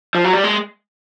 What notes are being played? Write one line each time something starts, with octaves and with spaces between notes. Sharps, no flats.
F3
F#3
G3
G#3